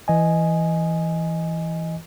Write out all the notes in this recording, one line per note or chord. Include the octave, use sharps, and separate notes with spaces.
E3 D#5 G#5